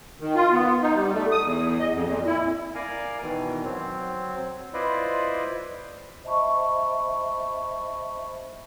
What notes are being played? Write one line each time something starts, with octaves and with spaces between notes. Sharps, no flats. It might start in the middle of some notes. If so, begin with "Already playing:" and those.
D#3
F4
B3
D#4
G3
A3
D#6
E2
D#5
F2
A#2
E4
A#4 D5 F5 G#5 A#5
B2 D#3 E3
F#3 C4
E4 F4 B4 C5 D5 D#5
C5 D#5 E5 A5 B5 C#6